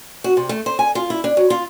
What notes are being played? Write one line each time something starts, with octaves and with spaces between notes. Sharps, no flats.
F#4
C3
A3
C5
G#5
F4
E4
D4
F#3
F4